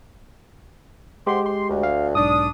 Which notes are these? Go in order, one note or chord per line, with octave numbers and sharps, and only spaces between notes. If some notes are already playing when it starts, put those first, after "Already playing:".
G#3 G4 C5 F#5 C6
C6
D2
F5
B1 G#2 D4 D#6